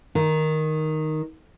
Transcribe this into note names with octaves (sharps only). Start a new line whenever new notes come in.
D#3